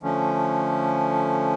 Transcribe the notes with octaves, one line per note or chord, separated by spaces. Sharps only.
D3 F3 A3 C#4